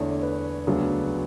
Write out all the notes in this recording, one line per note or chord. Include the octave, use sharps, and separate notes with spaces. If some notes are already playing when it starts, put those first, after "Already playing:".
Already playing: E2 D3 A3 D4 C#5
B4
D2 C#3 F#3 B3 D4